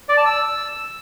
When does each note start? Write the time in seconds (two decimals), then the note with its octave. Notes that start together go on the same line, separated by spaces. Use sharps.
0.09 D5
0.17 A5
0.26 E6